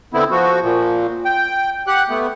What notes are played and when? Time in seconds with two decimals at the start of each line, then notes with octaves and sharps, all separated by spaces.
0.14 D3 B3 C4 E4
0.31 F3 F#4
0.63 A#2 F3
1.25 G5
1.87 G4 F#5 F#6
2.09 A3 B3